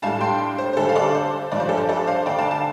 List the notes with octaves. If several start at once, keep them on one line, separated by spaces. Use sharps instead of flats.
A2 G3 D4 F5 A5
G5 C6
C5
C5
D3 G3 D4 A4
F5
A4 D5
C5
G2 F3 D4 D5
C5
A4
C5
A4 D5
C5 F5
D3 A3 D4 D5 G5
F5 A5
F5 A5